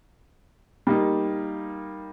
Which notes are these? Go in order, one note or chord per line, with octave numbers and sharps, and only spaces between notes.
G3 A#3 D#4